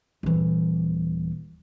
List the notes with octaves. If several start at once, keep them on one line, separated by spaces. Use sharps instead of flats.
D#1 E3